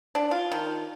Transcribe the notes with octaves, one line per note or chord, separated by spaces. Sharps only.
D4
F4
D#3